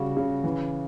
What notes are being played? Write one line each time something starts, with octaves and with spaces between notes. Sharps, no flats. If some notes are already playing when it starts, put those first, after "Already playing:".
Already playing: C#3 G3 F#4
C#3
E3